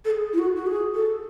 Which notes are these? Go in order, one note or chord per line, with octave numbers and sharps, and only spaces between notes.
A4
G#4
E4
F#4
F#4
G#4
A4